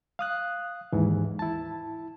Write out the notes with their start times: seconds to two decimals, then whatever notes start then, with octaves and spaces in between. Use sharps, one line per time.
0.19 F5 D#6 F#6
0.93 D#2 G#2 E3
1.39 E4 A5